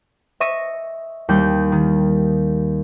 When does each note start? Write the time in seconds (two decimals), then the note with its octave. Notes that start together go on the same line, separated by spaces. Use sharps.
0.40 D#5 E5 C#6 A#6 D#7
1.29 D#2 G3 G6
1.72 D#3